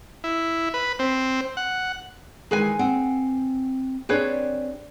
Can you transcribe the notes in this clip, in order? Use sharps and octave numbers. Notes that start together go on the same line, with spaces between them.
E4
B4
C4
F#5
D#3 E3 G#3 G#4 B4 G#5
C4 F#5 G5
C4 D4 G4 G#4 B4 C#5